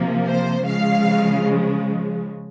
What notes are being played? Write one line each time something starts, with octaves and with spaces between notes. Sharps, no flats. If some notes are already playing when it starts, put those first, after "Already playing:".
Already playing: C3 F3 A#3
C5
C#3 F3 G#3 F5